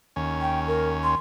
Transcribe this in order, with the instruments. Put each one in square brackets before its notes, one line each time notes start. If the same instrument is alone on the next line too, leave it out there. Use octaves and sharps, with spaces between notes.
[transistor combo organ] D#2 C#4
[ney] G5
A#4
C6